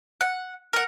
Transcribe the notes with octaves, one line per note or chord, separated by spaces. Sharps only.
F#5
A#4 F#5